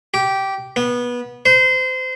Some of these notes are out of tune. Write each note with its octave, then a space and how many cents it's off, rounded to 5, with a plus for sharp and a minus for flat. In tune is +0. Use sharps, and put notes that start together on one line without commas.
G4 -15
B3 -20
C5 -25